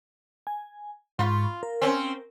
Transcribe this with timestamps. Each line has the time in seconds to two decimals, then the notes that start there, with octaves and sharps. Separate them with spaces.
0.47 G#5
1.19 G#2 F4 B5 C#6
1.63 A#4
1.82 C4 C#4